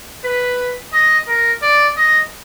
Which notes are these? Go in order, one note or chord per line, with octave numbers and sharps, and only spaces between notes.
B4
D#5
A#4
D5
D#5